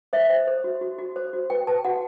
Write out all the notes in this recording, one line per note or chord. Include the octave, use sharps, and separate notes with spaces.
C5 E5
C5
C5
F#4
F#4
F#4
C5
F#4
B4 G5
B4 A5
F#4 F#5